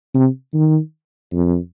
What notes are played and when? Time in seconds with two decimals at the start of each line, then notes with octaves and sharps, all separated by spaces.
0.14 C3
0.54 D#3
1.33 F2